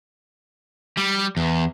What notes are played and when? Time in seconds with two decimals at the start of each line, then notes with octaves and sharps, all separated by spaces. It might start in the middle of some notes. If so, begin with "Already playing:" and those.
0.98 G3
1.37 E2